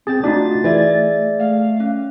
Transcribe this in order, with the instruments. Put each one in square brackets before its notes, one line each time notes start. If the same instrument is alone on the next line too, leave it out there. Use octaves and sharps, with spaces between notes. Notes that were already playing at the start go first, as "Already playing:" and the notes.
[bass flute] C4 [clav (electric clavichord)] G#4 G5 [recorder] A6
[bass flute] A3 [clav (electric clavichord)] D4 D#4 [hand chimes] F4 F#4
[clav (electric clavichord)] E3 [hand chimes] G#4 D5 E5
[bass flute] A3 [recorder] F5
[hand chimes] C#4